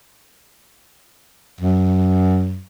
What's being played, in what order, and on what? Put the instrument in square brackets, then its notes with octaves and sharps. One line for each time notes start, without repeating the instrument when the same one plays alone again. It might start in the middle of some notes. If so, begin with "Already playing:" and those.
[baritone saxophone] F#2